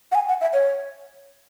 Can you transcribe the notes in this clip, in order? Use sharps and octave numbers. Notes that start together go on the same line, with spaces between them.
F#5
G#5
F#5
E5
C#5